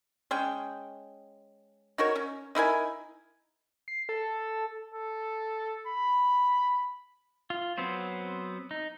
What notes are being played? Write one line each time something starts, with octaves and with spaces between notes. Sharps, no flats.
G#3 C#4 G5
D#4 F#4 A#4 C#5
C#4
D#4 E4 A#4 G#5
C7
A4
A4
B5
F4
F#3 B3 C4 C5
D#4